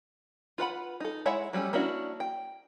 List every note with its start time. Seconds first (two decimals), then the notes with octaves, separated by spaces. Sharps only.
0.58 F4 B4 F#5 B5
1.00 D#4 A4
1.26 G#3 E4 C#5 E5 F#5
1.53 F#3 G3 A3 C#4
1.73 A#3 C#4 D4 E4 F#4
2.20 G5